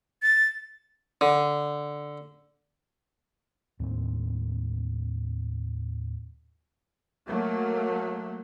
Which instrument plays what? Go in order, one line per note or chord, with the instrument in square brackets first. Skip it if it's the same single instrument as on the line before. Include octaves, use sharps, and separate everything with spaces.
[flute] A6
[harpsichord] D3
[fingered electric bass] D#2 A2 A#3 C4
[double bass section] F#3 A3 A#3